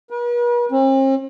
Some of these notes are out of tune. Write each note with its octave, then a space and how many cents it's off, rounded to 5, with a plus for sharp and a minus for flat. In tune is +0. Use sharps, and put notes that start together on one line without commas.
B4 -45
C4 +45